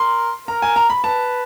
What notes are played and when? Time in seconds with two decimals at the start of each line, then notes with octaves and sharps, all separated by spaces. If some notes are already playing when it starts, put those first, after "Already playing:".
Already playing: A#4 C6
0.48 A#4 A#5
0.62 G#5
0.76 A#5
0.90 B5
1.04 B4 A5